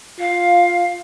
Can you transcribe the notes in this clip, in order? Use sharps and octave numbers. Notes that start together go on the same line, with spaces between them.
F4 F5